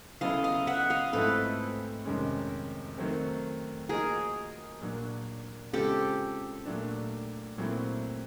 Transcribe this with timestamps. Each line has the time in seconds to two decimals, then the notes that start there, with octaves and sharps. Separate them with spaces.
0.21 C#3 F#3 B3 E4 A4 D#5 F5
0.44 D#5 F5
0.67 E5 F#5
0.90 D#5 F5
1.13 G#2 F3 A3 C4 E4 A4 B4
2.05 F2 C3 D#3 G#3 C#4
2.98 D#3 F#3 A3 C4
3.89 F3 A#3 D#4 F#4 G#4 A#4
4.81 A#2 F#3 A#3 D4
5.73 C#3 F3 G#3 C4 F4 G4 A4
6.66 A#2 F#3 A3 D4
7.58 A#2 F#3 A3 C4 E4